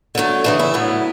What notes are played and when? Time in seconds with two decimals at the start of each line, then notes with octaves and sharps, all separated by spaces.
0.15 D3 F#3 A3
0.44 C#3 E3 A3 D4
0.59 E4
0.74 A2 F#3 B3